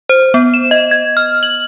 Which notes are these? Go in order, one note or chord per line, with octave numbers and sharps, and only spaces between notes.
C5
B3
E7
D#5
G#6
F6
F#7